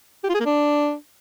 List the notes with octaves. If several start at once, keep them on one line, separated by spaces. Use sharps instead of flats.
G4
F4
G#4
A#3
D4